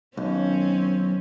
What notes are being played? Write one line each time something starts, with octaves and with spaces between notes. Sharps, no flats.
B1 D#3 C4 C#4